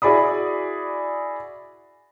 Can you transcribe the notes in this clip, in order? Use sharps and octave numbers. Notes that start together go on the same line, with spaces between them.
E4 F#4 G#4 D5 B5 D#6